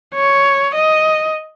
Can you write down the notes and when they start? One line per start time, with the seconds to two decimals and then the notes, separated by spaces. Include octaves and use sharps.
0.15 C#5
0.75 D#5